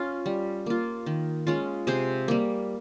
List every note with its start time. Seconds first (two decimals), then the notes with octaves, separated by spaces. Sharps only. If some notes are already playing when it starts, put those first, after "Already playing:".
Already playing: C#4 F4
0.26 G3
0.66 A#3 F4
1.06 D#3
1.47 G#3 C#4 F4
1.87 C3 G#4 C5
2.28 G3 A#3